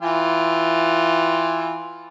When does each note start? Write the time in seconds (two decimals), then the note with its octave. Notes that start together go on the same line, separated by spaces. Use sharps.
0.03 E3 F4 G5